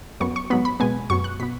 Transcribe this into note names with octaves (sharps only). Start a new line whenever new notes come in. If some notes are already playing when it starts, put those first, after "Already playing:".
F#2 F#3 B3 C#6
C#6
G#2 F#3 B3 B5
B5
B2 G#3 B3 G#5
F#2 F#3 B3 C#6
F#6
B2 B3 B6